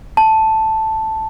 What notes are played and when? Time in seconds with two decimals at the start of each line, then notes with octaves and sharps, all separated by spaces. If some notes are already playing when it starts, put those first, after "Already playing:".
0.17 A5